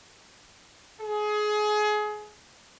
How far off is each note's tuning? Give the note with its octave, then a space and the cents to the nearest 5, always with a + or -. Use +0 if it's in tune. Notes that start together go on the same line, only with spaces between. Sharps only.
G#4 +25